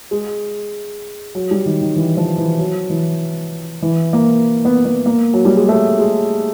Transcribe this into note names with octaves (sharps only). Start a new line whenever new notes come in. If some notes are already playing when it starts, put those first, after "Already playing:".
G#3
F#3
G3
D#3
D#3
E3
F3
E3
F#3
E3
E3
A#3
B3
B3
A#3
F#3
G3
G#3
A3
G#3